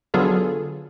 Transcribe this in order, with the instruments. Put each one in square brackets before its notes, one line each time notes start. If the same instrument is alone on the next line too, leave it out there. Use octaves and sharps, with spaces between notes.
[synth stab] D3 F#3 B3 F4 G#4 A4